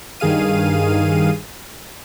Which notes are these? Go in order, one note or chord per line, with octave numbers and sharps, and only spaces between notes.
G2 D#3 G#4 F5 D#7